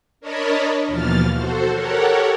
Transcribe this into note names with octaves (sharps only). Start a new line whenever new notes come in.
D4 A#4 C#5 D#5 A5 B5
D#2 B2 E3 F3 F6 A6
F#4 A4 C5
G4 A4 A#4 C#5 F#5